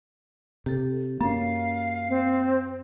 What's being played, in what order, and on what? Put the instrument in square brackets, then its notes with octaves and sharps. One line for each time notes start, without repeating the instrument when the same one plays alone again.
[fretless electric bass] C3 [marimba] G4 A4
[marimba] F#2 [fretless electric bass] A#3 C#4 [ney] F5
[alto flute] C4